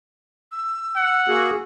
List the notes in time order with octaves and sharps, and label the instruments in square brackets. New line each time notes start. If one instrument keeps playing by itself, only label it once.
[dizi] E6
[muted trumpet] F#5
[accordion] A#3 F#4 G#4